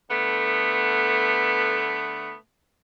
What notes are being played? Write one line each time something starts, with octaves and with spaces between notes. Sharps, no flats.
D3 A3 B3